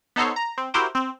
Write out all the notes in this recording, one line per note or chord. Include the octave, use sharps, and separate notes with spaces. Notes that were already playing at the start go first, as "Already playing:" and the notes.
B3 D#4 A4 C5 C#5
A#5
C4
E4 F#4 G4 A#4 C5 G5
C4